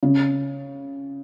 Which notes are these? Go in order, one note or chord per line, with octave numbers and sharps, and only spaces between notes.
C#3